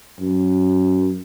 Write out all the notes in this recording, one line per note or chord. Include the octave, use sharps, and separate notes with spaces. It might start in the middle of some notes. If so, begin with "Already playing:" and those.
F#2